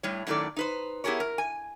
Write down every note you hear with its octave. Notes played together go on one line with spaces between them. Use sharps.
A2 G3 C#5
F#2 A2 D#3 D4 A4 D5
D#4 B4 C5
B3 E4 G4 G#4 A#4 C#5
A#4
G#5